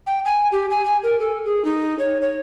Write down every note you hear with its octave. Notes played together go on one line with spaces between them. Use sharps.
G5
G#5
G4
G#5
G#5
A#4
A4
G#4
D#4
C#5
C#5